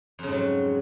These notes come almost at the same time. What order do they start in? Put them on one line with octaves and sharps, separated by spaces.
F2 C#3 G#2 F#3